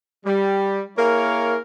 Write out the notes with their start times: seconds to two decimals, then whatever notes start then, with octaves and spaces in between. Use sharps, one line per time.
0.25 G3
0.97 A#3 E4 G#4 A#4 C#5 F5